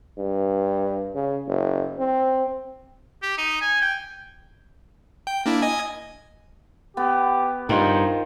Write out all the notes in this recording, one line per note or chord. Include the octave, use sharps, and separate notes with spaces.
G2
C#3
F#1
C4
G4
D#4
G#5
G5
G5
A#3 D4 E4
D#5 G#5
B3 G4
G2 D#3 D#4 F4 C5